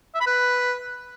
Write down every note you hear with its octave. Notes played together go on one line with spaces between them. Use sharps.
E5
B5
B4